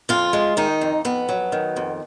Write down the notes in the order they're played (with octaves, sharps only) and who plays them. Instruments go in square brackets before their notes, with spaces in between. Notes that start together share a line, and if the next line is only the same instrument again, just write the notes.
[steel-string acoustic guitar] F2 F4
G#3
D#3 D#4
F2
F2 B3
F#3
D#3
F2